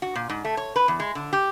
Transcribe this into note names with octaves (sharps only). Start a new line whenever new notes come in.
F#4
A#2
G#2
A3
C#5
B4
E2
G#3
D3
G4